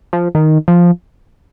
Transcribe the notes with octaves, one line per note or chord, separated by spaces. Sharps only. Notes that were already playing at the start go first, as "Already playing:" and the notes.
F3
D#3
F3